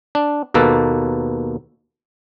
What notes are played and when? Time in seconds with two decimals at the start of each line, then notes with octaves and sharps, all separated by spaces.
0.15 D4
0.54 D#2 B2 A#3 A4 B4